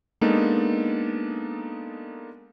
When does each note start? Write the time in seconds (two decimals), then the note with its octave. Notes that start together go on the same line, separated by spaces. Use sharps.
0.21 G#3 A#3 B3 D4 D#4 A4